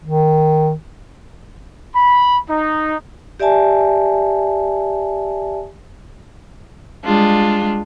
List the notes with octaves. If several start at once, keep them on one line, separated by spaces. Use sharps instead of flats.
D#3
B5
D#4
G4 D5 E5 G#5 A5
G3 G#3 D4 F4